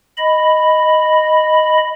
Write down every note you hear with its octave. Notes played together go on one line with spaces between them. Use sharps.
D#5 B5